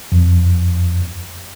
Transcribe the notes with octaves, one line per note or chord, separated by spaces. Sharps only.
F2